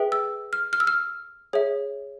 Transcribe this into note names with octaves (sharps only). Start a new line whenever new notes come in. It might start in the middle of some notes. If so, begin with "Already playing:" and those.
Already playing: G#4 B4 E5 G5
E6
F6
F6
E6
F6
G#4 C#5 E5